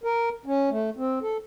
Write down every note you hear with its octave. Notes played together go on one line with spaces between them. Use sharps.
A#4
C#4
A3
C4
A4